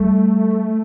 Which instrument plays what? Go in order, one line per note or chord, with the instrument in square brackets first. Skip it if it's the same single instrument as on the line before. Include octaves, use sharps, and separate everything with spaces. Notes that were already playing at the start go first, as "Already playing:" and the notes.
Already playing: [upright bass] G3 [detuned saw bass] A3